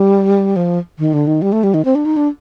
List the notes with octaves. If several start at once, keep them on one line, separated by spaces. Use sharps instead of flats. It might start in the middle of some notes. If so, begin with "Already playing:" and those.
Already playing: G3
F3
D#3
D3
D#3
G3
A3
G3
D#3
C4
D4
D#4
D4